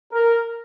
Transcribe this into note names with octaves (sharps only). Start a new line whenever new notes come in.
A#4